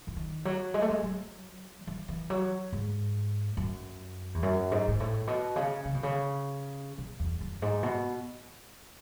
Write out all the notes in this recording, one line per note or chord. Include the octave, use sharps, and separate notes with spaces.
E3
D#3
F#3
G#3
A3
G#3
F#3
E3
E3
F#3
G#2
F#2
E2
F#2
G#2
G#2
A2
B2
C#3
C#3
B2
C#3
B2
E2
F#2
G#2
B2